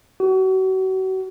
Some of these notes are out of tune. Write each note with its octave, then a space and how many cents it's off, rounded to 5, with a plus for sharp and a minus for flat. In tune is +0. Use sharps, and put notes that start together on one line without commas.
F#4 +35